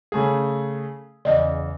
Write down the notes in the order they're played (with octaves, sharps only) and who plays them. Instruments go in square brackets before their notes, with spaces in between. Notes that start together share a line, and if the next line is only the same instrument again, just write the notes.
[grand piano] C#3 A3 G#4
[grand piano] E2 C#3 [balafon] D5 D#5